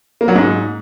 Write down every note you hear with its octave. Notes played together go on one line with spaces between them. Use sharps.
A#3
F#3
G#2